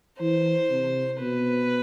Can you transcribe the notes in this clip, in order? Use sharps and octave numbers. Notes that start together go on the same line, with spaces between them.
E3 C5
C3
B2 B4